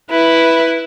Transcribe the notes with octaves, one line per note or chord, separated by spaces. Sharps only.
E4 B4